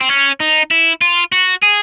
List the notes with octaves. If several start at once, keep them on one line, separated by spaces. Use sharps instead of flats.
C4
C#4
D#4
E4
F4
F#4
G#4